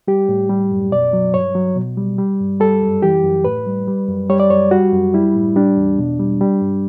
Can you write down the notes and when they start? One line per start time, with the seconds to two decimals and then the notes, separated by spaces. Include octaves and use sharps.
0.08 G3 G4
0.29 A2
0.49 G3
0.71 F#2
0.91 B2 D5
1.13 F#3
1.34 G2 C#5
1.55 F#3
1.76 B2
1.97 G3
2.18 G3
2.40 G2
2.60 G3 A4
2.82 F#2
3.02 E3 G4
3.23 F#2
3.45 A2 B4
3.67 G3
3.88 G3
4.08 F#2
4.29 G3 C#5
4.40 D5
4.50 F#2 C#5
4.71 G3 F#4
4.92 F#2
5.14 G3 E4
5.35 A2
5.56 G3 D4
5.77 E2
5.99 B2
6.19 G3
6.41 G3
6.61 G2